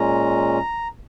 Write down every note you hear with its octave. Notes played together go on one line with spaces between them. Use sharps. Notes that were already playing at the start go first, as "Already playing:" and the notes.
Already playing: A#2 G#3 C#4 A#5